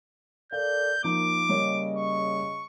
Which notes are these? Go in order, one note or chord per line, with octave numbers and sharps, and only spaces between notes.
A4 A#4 D5 F5 G6
F3 A#3 D#4 D6
C#3 G3 A#3 C#5 D#5
C#6